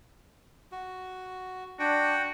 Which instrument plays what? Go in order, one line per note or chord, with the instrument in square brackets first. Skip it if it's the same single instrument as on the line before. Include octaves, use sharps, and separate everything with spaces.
[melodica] F#4
[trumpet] D4 [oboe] F#4 [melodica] G5